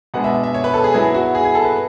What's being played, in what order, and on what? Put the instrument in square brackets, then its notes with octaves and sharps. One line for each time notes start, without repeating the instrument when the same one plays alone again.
[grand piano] B2 G#3 B3 D4 F#5
E5
E5
C#5
B4
A4
G#4
F#3 B3 E4 G#4
F#4
G#4
G#4
A4
B4